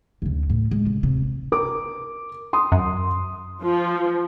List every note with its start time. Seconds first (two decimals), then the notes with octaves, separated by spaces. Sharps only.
0.22 D2 C#3
0.50 A2
0.71 G#3
0.86 C#3
1.03 C3
1.52 A#4 D6
2.53 C6 D#6
2.72 F#2
3.64 F3